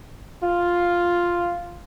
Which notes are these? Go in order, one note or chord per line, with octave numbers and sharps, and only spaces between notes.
F4